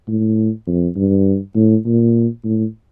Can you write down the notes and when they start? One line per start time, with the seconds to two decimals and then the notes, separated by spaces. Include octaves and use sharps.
0.08 A2
0.67 F2
0.96 G2
1.55 A2
1.86 A#2
2.44 A2